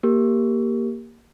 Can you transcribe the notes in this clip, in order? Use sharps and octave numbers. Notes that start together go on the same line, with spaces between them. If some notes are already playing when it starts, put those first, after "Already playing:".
A#3 G4 A#4